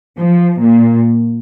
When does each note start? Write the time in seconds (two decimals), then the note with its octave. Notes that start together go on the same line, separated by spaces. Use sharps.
0.18 F3
0.60 A#2